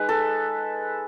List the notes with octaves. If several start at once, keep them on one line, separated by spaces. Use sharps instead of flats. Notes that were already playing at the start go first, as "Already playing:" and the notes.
Already playing: G#3 D#4 B4
A4